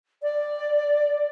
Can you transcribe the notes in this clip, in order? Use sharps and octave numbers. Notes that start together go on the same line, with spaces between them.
D5